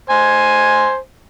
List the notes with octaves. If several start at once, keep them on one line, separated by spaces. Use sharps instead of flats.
C5 G#5